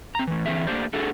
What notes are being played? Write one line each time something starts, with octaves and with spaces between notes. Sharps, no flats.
C4 A#5
A2 E3
D3 E3 C4 G4 G#4 E5
A3 A#3 D4 G4 C5 D5
A3 D4 F#4 G#4 A4